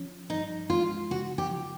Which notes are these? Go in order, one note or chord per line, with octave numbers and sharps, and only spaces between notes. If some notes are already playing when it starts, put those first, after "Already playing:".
Already playing: F3 C#4
G2 D#4
G#3 F4
C#3 F#4
G4
F3